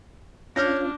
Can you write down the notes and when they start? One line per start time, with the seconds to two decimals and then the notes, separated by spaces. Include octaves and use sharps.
0.56 C#4 D4 F4 C#5 F6 G6 A#6